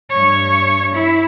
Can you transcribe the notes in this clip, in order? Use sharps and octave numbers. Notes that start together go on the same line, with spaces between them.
G2 C#5
E4